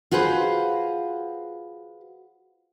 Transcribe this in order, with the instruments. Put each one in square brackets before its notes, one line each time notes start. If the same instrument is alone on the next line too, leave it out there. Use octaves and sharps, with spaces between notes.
[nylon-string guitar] F4 F#4 G#4 B4 C5